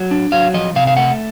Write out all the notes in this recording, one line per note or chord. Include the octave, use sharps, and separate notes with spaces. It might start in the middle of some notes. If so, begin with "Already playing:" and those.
Already playing: F#3
D4
F#3 F5
F3 D#5
C3 F5
F5
A3 F#5